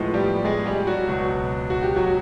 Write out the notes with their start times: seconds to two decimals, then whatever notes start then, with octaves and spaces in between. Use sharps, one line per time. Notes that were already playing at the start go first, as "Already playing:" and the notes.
Already playing: A2 F3 G#3 B3
0.14 G3 G4
0.45 G#3 G#4
0.66 G3 G4
0.87 F#3 F#4
1.07 C#2 B2 F#3
1.70 F#4
1.83 G4
1.96 F#3 F#4